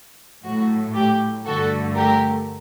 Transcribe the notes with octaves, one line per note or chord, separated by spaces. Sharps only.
A2 F#3 A3 F#4
G4
G2 D3 A3 F#4 A4
G4 A#4